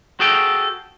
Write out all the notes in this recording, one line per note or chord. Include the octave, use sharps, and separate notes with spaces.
F#4 G#4 A4 G5